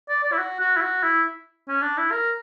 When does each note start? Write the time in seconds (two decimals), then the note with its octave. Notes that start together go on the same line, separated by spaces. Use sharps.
0.09 D5
0.24 D5
0.32 E4
0.38 F#4
0.60 F#4
0.77 E4
0.82 F#4
1.03 E4
1.68 C#4
1.82 D4
1.98 E4
2.12 A#4